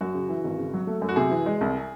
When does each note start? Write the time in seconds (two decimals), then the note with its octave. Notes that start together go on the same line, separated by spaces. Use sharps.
0.01 F#2 F#4
0.14 C#3
0.29 E3
0.44 G#1
0.58 C#3
0.74 F#3
0.87 A3
1.02 F#2
1.09 F#4
1.16 C3 G#4
1.31 E3
1.46 G#3
1.61 C2